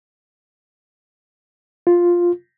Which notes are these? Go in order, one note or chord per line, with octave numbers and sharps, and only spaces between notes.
F4